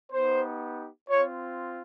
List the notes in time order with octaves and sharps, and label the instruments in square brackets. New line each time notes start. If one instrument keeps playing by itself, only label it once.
[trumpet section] B3 D#4 G4 C5
C4 F4 C#5